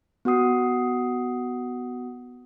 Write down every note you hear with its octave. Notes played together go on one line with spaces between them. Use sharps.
B3 F#4 F#5 D#6 C7